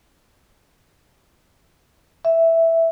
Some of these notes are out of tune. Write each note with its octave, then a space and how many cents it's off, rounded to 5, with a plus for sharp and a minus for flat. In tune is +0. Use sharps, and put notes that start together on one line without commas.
E5 +0